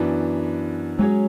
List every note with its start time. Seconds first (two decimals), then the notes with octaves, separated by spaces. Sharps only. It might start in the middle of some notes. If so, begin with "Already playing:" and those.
Already playing: F#2 E3 B3 D4
0.98 F#3 G#3 C#4 G#4 C#5